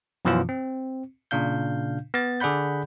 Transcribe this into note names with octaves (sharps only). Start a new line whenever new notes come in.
F#2 B2 E3 F3 C#4 F4
C4
A#2 C#3 D4 F5 G6
B3 A6
D3 G#4 D5 F#5 B5 G6